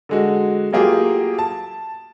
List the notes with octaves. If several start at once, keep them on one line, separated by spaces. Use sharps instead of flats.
D3 G#3 F#4
F#3 A3 A#3 F4 G4 G#4
A5